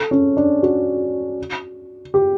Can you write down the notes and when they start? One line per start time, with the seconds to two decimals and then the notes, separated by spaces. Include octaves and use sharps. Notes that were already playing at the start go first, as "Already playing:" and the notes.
Already playing: A4
0.11 C#4
0.37 D4
0.63 F#4
2.14 G4